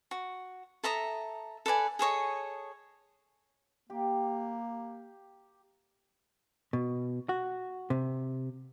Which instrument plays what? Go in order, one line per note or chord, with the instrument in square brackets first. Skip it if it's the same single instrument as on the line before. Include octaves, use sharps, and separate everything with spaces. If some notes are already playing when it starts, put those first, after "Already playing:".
[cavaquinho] F#4
A4 E5 A#5 D#6
A4 B4 D5 G#5
G#4 A4 C#5 D#5
[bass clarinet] A#3 [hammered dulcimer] G4
[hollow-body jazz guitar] B2
F#4
C3